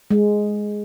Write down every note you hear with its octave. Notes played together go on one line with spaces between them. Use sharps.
G#3